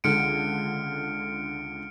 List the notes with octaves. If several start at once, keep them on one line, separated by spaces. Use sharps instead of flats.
C#2 D3 F6 C#7 D7